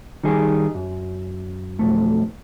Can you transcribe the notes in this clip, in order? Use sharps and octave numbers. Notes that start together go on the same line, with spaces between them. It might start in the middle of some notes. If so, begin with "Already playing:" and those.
D#3 G3 D#4 G#4
F#2
B1 F2 A3